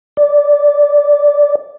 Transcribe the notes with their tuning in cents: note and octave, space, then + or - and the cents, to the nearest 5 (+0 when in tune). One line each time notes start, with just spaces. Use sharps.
D5 -10